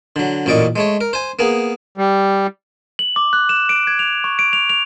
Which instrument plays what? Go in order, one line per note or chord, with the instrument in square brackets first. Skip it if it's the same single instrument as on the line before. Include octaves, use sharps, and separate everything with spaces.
[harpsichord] D3 F#3
A1 F#2 A#2 D5 D#5 C#6
G#3 A3 C#5
A#4
C5 G#5
A#3 B3 G#4
[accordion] G3
[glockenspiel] F#7
D6
F#6
E7
D7
G#6
F7
C#6
D7
F7
F7